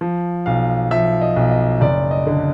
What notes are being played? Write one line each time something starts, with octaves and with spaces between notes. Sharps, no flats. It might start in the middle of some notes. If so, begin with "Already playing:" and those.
F3
B1 F5
F3 E5
D#5
B1
D#5
F#1 D5
D#5
D3